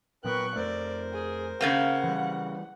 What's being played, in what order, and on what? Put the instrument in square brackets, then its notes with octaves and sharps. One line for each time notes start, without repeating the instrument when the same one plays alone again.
[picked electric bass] A#2 F#3 B3 [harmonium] A#4 B4 G5 [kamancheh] C#6 F#6
[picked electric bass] F2 A3 [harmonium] A#4 C5 [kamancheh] D5
[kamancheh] G#4
[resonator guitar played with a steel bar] C#3 A#3 C4 [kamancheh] F#5
[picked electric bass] E3 G3